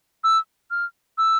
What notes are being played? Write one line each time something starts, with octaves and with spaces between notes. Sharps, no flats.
E6
F6
E6